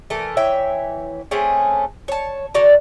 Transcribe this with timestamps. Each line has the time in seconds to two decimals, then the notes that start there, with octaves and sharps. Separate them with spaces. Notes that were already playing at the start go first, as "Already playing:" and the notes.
0.10 E3 A3 A4 A#4
0.37 E3 C#5 E5 G5
1.31 A3 C4 C#4 G#4
2.08 C#5 A5
2.54 D3 F#4 D5 A#5